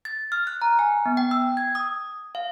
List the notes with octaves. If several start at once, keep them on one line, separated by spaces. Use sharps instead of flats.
A6
F6
F#6
A#5
G#5
B3
G5
E6
G#6
D#6
F5